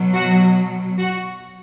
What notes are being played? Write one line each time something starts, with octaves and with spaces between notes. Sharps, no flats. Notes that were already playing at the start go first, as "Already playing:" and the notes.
Already playing: B2 F#3
F#4
F#4